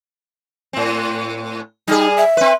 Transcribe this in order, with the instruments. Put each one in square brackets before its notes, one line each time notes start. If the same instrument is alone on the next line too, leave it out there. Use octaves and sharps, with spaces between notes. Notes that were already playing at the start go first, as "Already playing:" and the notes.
[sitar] A2 C4
[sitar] G3 G#4 [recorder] D#4
[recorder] E5
[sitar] C4 B4